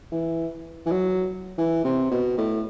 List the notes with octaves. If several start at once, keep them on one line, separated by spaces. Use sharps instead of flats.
E3
E3
F#3
E3
C3
B2
A2